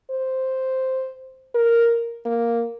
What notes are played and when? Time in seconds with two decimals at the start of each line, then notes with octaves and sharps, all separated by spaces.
0.11 C5
1.55 A#4
2.26 A#3